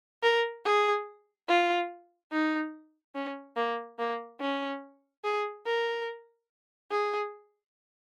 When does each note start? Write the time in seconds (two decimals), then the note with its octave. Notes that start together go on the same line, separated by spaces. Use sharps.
0.23 A#4
0.65 G#4
1.48 F4
2.32 D#4
3.15 C#4
3.57 A#3
3.99 A#3
4.41 C#4
5.24 G#4
5.66 A#4
6.91 G#4